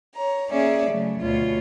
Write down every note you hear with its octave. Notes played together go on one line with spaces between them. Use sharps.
C#5 A#5
A#3 C#4 G#4 D5 E5
C#3 F#3 A3
D2 B2 F4 C#5